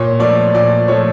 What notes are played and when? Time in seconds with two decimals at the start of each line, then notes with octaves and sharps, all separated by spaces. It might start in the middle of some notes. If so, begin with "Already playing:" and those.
Already playing: A#2 C#5
0.19 F3 A3 D5
0.54 A#2 D5
0.88 F3 A3 C#5